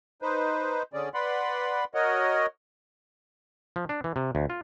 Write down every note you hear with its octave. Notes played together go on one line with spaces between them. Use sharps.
D#4 B4 C5
D3 C#4 G#4 D5
B4 D5 F#5 B5 C6
F#4 A#4 C#5 D#5 F#5
F3
D4
E3
C3
D2
F4